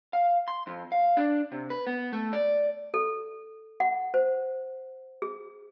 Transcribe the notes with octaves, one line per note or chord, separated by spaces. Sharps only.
F5
C6
F2
F5
D4
C3
B4
B3
A3
D5
A4
F#5
C5
G#4